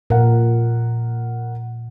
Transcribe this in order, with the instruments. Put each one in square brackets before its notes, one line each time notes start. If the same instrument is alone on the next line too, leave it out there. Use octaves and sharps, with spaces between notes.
[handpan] A#2 [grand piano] A#4 F#5